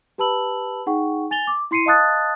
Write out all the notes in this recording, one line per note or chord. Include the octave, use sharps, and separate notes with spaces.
G4 B4 A5 B5 E6 F#7
D#4 G#4 F#5 G5 C#6
G#5 A6 F7 G7
D6
E4 C6 C7 C#7 D#7
D#5 F5 A5 D#6 F#6 A6